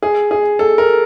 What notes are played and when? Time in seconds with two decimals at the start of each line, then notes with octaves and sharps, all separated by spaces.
0.03 G#4
0.31 G#4
0.59 A4
0.78 A#4